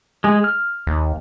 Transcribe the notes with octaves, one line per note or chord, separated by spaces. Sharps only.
G#3 G#4
F6
D#2